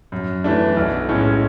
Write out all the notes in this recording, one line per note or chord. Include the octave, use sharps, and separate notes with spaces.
F#2
E3 A3 D4
B1
A2 G#3 C#4